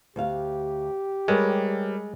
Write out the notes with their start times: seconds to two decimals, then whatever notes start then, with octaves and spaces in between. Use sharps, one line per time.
0.16 D2 G4 F5
1.28 G3 G#3 A#4 B4 C#5